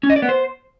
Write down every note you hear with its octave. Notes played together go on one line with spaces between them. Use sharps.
C#4
D#5
D5
B3
C5